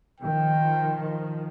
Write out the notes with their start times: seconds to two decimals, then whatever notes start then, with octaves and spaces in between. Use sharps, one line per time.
0.20 D#3 F3 G5